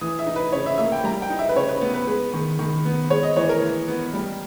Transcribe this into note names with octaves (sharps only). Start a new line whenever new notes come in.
E3 D#6
E5
D#4
B4
C#3 C#5
E5
A#3 E5
G5
G3 A#5
G5
D#4
E5
B4
C#3 C#5
B4
B3
B4
G#3 B4
D#3
D#3
B3
G#3 C#5
D#5
E3 C#5
A#4
E3
B3
G3